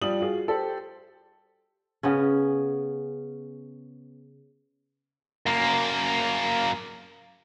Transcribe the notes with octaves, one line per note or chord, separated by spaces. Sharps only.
F3 G3 F4 D#6 F#7
F4 F#4 G#4
G4 A4 C5
C#3 B3 C#4
F#2 A#3